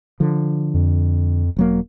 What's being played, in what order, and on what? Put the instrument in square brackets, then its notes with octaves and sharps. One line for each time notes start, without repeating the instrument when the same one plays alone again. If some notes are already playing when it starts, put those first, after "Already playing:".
[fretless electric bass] D3 F3
[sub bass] F2
[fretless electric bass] E1 F#3 A#3